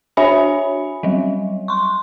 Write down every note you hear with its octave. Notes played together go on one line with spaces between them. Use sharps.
D4 F#4 C#5 E5 G#5 B5
F#3 G3
C6 C#6